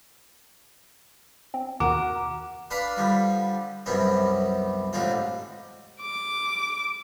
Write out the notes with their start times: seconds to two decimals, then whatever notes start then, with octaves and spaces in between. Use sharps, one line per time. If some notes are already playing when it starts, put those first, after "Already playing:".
1.54 C4
1.80 D#2 B2 D#3 F#4 A#4 D6
2.71 D4 B4 F5 B5
2.97 D3 F3 G3
3.86 C2 F#2 C3 B3 C#4
4.93 A1 G#2 D3 C4 F4
6.01 D6